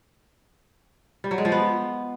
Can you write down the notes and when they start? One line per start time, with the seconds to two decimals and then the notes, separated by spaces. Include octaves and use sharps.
1.24 G3
1.31 F#3
1.38 G#3
1.45 F3
1.52 B3